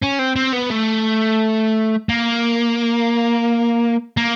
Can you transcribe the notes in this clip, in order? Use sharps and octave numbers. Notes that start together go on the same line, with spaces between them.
C#4
C4
C4
B3
A3
A#3
A#3